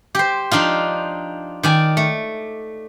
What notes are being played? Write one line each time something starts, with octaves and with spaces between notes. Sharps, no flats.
G4 C5
F3 D4 D#4 F4
D#3 D5 G#5
A3